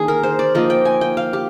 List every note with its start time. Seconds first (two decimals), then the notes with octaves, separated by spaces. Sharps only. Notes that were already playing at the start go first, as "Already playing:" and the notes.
Already playing: D#3 A#3 D4 G#4
0.08 A#4
0.23 C5
0.39 D5
0.55 F3 A#3 D#4 D#5
0.70 G5
0.85 G#5
1.01 G5
1.17 F5
1.33 G4